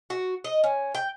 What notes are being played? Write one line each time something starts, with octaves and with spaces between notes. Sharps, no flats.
F#4
D#5
C#4
G5